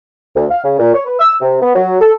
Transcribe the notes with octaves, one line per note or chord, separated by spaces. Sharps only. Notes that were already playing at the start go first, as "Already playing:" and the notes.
D2
F5
C#3
A#2
C#5
B4
E6
C3
B3
F#3
A4